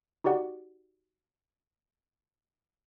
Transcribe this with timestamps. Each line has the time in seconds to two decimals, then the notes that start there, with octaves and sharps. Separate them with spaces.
0.24 D#4 F#4 G4 D5 F#5